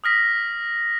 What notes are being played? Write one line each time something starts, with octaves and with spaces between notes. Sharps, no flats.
D#6 F6 A#6 B6